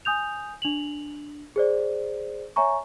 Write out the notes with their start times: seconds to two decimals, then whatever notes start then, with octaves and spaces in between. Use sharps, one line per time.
0.05 G#5 D#6 G6 F7
0.62 D4 F7 F#7
1.56 G#4 C5 D5
2.56 C#5 E5 G#5 A#5 C#6